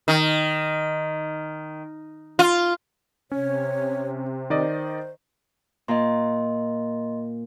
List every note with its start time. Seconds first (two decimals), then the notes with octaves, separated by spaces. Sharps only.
0.08 D#3
2.39 F4
3.32 C3 C#4 C#5
4.50 D#3 C5 D5 D#5
5.88 A#2 D#5 C6